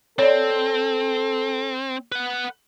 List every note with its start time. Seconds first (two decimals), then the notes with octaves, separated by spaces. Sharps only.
0.19 C4 A4 C#5 D5
2.12 B4 F#5